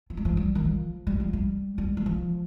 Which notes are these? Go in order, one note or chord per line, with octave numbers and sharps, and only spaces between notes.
F3
G3
F3
G3
D#3
F3
G3
F3
G3
G3
G3
F3